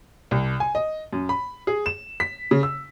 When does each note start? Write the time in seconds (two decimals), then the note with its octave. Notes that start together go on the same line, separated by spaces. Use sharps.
0.31 C2
0.60 G#5
0.75 D#5
1.13 F#2
1.29 B5
1.67 G#4
1.86 E7
2.20 B6
2.51 C#3
2.63 E6